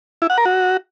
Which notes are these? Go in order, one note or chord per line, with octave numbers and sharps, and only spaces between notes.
E4
F#5
A#4
F#4